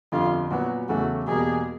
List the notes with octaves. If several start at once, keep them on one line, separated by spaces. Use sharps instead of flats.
G1 F2 D3 F4
A#2 F#3 B3 F#4
E2 C#3 F#3 A3 F#4
E2 B2 G3 A#3 G#4